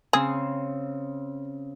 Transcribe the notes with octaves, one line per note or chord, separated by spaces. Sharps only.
C#3 C4 G#4 C6